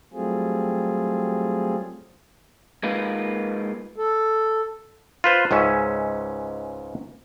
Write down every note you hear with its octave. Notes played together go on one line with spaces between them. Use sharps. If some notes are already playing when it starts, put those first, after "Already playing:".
F#3 G3 A3 C4 F4 G#4
G#3 A#3 D#4 F4 B4
A4
F4 B4 C5
C#2 G#2 C#4 E5 G#5